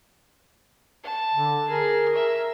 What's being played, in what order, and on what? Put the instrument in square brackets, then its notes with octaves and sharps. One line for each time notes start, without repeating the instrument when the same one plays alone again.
[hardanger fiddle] A5
[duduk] D3
[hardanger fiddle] G#4 [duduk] A#4
[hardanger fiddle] E5